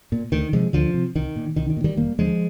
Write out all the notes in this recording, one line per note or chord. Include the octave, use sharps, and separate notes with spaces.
A#2
D2 D#3
C3 F3 G#3
D2 D3 F3
C3
C2 D#3
A#2
C2 D#3
D#3
A#2
D#3 G3
F1 G3 A#3
D#2 D3 F3 G#3